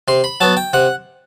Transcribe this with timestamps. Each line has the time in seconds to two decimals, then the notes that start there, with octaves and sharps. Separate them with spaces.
0.08 C3 C6
0.24 B5
0.41 F#3 B3 A5
0.57 G5
0.73 C3 F#5